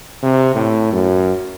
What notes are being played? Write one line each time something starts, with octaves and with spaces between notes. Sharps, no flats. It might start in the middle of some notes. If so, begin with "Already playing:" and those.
C3
A2
F#2